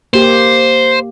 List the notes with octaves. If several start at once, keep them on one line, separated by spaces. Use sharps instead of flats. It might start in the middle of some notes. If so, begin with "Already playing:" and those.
A#3 G4 C5